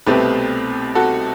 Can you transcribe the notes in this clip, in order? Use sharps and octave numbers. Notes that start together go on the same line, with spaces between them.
C2 B2 A3 C4 G4 B4
F#4 A4